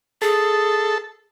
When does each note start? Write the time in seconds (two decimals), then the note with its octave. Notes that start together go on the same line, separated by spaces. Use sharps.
0.22 G#4 A4